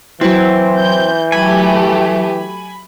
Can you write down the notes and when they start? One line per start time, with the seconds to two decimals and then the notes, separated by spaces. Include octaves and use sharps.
0.21 E3 F#3 C4 E4
0.79 G6
1.32 F#3 A3 G4 G#5 B5